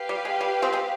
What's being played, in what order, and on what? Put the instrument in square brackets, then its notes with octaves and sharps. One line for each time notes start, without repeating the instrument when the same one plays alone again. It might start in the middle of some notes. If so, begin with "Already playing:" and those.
Already playing: [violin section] G4 B4 F5
[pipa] G3
G#3
G3
G#3 C4
G#3 C4